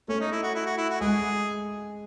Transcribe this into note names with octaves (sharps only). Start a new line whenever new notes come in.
A3 C#4
D#4
E4
F#4
E4
F#4
E4
F#4
G#3 G#4